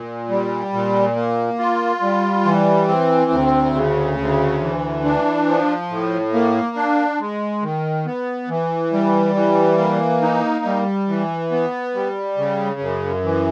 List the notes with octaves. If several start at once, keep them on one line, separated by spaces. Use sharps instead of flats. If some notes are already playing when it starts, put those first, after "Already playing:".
Already playing: A#2
G3
A#2
A#3
F4
G3
E3
C4
D2
C#3
D2
E3
D4
F3
A2
A#3
D4
G#3
D#3
B3
E3
G3
E3
A#3
D#4
G3
E3
B3
G3
C#3
F#2
E3